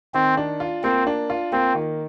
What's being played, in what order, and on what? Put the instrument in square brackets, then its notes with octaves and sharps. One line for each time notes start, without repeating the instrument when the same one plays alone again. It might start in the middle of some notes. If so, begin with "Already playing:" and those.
[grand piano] D#3 [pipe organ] C4
[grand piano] D4
F4
[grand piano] A#3 [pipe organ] C4
[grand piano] D4
F4
[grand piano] A#3 [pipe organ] C4
[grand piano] D#3